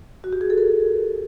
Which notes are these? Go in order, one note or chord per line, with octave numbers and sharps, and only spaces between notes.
F#4
G4
G#4
A4
A#4